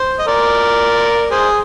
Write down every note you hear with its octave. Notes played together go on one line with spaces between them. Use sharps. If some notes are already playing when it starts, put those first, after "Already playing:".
Already playing: C5
D#5
A#4 D5
G#4 C5